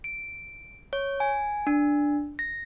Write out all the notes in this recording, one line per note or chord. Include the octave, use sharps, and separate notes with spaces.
D7
C#5
G#5
D4
A#6